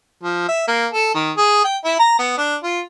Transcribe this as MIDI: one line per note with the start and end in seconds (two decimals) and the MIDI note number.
0.23 0.43 53
0.48 0.67 76
0.67 0.86 58
0.92 1.12 69
1.14 1.31 51
1.37 1.62 68
1.64 1.77 79
1.84 1.98 64
1.99 2.18 82
2.19 2.34 59
2.37 2.56 62
2.63 2.80 65